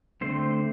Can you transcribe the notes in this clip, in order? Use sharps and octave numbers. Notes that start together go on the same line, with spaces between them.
D3 A3 C4 C5